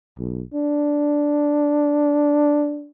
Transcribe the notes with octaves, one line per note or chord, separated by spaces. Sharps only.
B1
D4